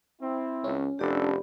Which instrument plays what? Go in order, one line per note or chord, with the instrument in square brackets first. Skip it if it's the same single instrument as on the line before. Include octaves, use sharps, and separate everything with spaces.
[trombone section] C4 E4
[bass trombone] C#2 [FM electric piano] C#4
[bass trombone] F1 [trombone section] D4 A4 [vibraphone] G4 D5 B5